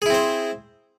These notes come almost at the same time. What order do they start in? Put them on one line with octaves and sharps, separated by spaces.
G#4 E4 C4 C5